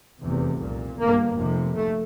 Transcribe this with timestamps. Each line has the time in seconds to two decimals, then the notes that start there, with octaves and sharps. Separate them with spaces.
0.21 F1 E2 C3
0.59 C2 A#2
0.98 G1 G2 A#3
1.37 F1 F2 C3
1.75 A3